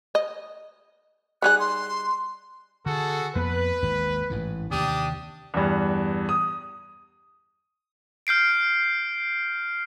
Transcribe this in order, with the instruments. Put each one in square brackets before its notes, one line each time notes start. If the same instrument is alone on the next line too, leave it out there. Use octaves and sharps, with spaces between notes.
[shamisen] D#5
[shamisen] G3 D#4 G#4 [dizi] F#6
[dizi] C6
[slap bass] D3 [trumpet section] F#4 G#4 A4
[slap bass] F2 A#3 B3 [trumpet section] B4
[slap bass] G#1 D#2 G#2
A1 G#2 E3
[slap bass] D#2 C3 [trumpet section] D4 G4 D#6
[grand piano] E2 G2
D#6
[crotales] F6 G6 C7 D7